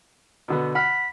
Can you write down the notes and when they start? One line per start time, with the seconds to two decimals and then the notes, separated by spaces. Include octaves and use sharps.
0.48 B2 D3 B3
0.75 F#5 B5 F6 B6